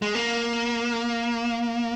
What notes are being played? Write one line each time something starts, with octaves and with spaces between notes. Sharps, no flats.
G#3
A#3